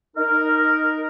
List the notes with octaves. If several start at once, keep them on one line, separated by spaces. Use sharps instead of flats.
D#4 A#4